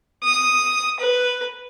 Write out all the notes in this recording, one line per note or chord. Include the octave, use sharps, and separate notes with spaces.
D#6
B4